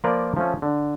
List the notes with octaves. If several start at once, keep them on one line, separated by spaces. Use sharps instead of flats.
F3 A#3 F4 A#4 B4 D5
F3 A3 C#4
D3